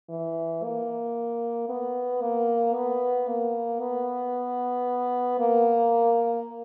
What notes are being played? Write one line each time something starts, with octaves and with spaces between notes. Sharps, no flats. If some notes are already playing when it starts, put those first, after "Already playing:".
E3
A#3
B3
A#3
B3
A#3
B3
A#3